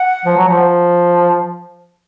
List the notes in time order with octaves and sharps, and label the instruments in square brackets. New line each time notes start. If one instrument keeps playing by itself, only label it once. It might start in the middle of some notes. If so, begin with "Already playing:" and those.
Already playing: [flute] F#5
[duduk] F3
F#3
F3